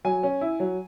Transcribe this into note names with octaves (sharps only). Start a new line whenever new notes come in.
F#3 G#5
C#4
E4
F#3